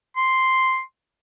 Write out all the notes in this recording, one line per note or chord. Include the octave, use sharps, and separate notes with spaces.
C6